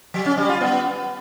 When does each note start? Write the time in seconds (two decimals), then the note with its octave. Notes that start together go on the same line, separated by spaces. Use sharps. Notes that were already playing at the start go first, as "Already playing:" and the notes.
0.14 F#3
0.26 C#4
0.37 G3
0.49 F4
0.61 B3